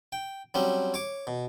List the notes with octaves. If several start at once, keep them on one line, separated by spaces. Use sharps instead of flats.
G5
F#3 G3 C4 C#4
C#5 D6
B2